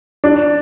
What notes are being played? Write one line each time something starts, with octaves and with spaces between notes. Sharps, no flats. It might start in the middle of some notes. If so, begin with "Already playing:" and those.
D4